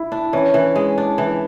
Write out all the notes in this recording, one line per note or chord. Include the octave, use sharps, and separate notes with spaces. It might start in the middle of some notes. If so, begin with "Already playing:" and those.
Already playing: E4
D4
E3 C#4
E3
G#3
D4
E3